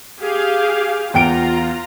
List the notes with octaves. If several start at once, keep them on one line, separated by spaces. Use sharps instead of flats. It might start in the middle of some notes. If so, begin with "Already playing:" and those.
G4 G#4 F5
E2 F4 G5 A#5 D7